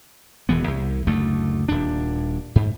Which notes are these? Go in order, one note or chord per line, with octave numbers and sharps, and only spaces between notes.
D#1 E3 B3
C2
F#1 D2 A3
D#1 D4
G#2